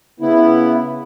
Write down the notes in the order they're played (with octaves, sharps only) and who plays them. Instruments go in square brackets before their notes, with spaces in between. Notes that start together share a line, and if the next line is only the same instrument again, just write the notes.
[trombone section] C#3 B3 [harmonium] E4